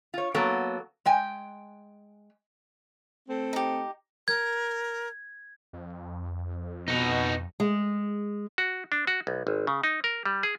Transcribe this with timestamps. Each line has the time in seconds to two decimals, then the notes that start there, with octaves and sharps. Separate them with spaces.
0.14 F4 C#5
0.34 F#3 A#3 B3 A4 C#5
1.05 G#3 G5 G#5
3.29 A3 C4
3.53 D#4 G4
4.28 A#4 G#6
5.73 F2
6.88 B2 D#4 F#4
7.60 G#3
8.58 F#4
8.92 D4
9.07 F#4
9.27 B1
9.47 G#1
9.67 C#3
9.84 D#4
10.04 A#4
10.25 G3
10.43 G#4